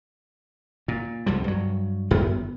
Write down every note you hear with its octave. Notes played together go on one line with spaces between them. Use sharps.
A#2
C2 F2 F3 G3
G2 F#3
G1 F#2 B3